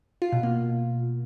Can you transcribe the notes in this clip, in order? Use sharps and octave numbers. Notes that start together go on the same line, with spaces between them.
F4
B2
A#3